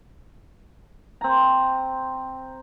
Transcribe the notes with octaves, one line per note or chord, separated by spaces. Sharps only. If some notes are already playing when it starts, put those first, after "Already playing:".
C4 A#5